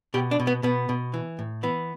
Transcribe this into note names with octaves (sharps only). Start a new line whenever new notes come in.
B2 G4
D4
B2
B3
B2 B3
B2
E3
A2
E3 B3